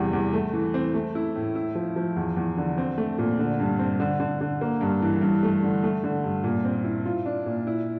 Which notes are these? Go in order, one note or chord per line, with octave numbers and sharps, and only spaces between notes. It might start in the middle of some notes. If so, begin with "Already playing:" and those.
Already playing: E2 C3 G3
E2
A3
E3
C4
A3
E4
A2
E4
F3
F3
E2
E2
D3
C4
A3
A#2
D3
G2
C4
D3
D3
D3
A#3
G2
E3
G2
A3
D3
A3
D3
G2
A#2
C4
E4
F4
D4
A#2
E4